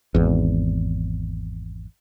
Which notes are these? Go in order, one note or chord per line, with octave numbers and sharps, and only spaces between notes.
G#1 E2